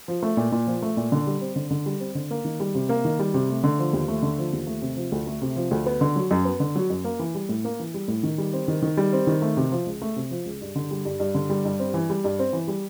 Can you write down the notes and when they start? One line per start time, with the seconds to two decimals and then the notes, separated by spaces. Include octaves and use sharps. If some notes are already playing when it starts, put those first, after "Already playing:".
0.08 F3
0.22 A3
0.37 A#2
0.52 A#2
0.67 F3
0.82 A3
0.97 A#2
1.12 D3
1.27 G3
1.41 C4
1.56 D3
1.71 D3
1.86 G3
2.00 C4
2.15 D3
2.31 A#3
2.45 D#3
2.60 G3
2.75 C3
2.89 A#3
3.05 D#3
3.19 G3
3.34 C3
3.49 A3
3.64 D3
3.79 F3
3.93 D#2
4.08 A3
4.23 D3
4.38 F3
4.53 D#2
4.67 A3
4.82 C3
4.97 F3
5.12 D2
5.27 A3
5.42 C3
5.56 F3
5.71 D2
5.86 B3
6.01 D3
6.16 F#3
6.31 F#2
6.45 B3
6.60 D3
6.76 F#3
6.90 F#2
7.04 A#3
7.19 E3
7.35 G3
7.49 A2
7.65 A#3
7.79 E3
7.94 G3
8.08 A2
8.23 D#3
8.38 G3
8.53 C4
8.68 D#3
8.82 D#3
8.97 G3
9.13 C4
9.27 D#3
9.42 A3
9.57 C3
9.72 F3
9.86 C#2
10.02 A3
10.16 C3
10.31 F3
10.46 C#2
10.61 G2
10.75 D3
10.91 G3
11.05 G2
11.20 G2
11.35 D3
11.50 G3
11.65 G2
11.79 C4
11.94 E3
12.10 G3
12.24 G2
12.39 C4
12.53 E3
12.68 G3